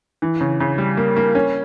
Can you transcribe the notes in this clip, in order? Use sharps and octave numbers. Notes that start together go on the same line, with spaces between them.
E3
C#3
C#3
G3
A#3
A#3
C#4